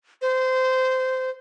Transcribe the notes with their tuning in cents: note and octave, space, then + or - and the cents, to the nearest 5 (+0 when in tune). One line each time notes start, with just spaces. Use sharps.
C5 -20